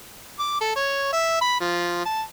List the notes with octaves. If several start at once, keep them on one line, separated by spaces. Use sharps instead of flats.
D6
A4
C#5
E5
B5
F3
A5